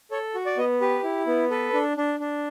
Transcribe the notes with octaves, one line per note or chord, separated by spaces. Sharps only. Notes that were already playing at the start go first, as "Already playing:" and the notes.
A4 C#5
F#4
D5
B3 D#5
G4 B4
E4
B3
A4 B4
D4
D4
D4